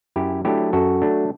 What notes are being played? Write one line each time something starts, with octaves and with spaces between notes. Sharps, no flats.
F#2 E4 G4
F#3 A3 D4 E4 G4
F#2 F#4 A4
F#3 A3 D4